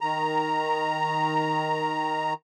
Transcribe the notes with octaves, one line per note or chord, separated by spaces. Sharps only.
D#3 A#5